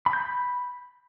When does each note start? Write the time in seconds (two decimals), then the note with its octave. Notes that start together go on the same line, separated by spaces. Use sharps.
0.06 B5
0.13 G6
0.20 B5